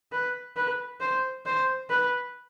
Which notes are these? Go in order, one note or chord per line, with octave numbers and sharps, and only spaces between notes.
B4
B4
C5
C5
B4